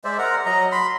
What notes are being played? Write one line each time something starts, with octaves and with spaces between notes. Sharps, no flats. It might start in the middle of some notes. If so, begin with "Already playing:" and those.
G#3 C5 D5 E5
A#4 F#5 A#5
F#3 D#5 A#5
B5 C6